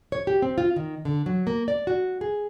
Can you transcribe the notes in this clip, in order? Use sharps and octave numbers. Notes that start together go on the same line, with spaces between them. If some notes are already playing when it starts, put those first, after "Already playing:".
C#5
G4
C4
F4
D#3
D3
F#3
A#3
D5
F#4
G#4